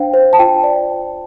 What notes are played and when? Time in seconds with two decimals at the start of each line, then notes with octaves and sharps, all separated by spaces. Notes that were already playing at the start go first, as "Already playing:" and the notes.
Already playing: D4 C5 F5 G5
0.14 C5
0.33 A5
0.39 F4 G5
0.63 D5
0.88 D5